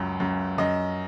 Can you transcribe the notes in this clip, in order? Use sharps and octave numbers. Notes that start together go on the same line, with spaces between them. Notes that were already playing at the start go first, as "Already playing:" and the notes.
Already playing: C#2 F#2
F#2
F#2 D#5